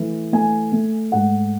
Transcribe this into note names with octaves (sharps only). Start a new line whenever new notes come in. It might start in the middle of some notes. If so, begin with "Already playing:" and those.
Already playing: E3 A3
A3 G#5
A3
G#2 F#5